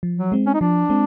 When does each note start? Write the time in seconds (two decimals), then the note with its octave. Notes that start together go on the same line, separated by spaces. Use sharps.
0.03 F3
0.18 F#3
0.32 G#3 C4
0.46 C#4
0.54 D#4
0.61 F3 D4
0.89 G#3 C4